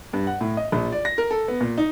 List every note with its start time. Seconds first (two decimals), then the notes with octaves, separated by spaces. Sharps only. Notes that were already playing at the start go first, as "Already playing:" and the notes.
0.13 G2
0.27 F#5
0.41 A2
0.57 D#5
0.72 A#1
0.92 D5
1.05 A#6
1.18 A#4
1.31 A4
1.48 B3
1.60 A#2
1.78 D#4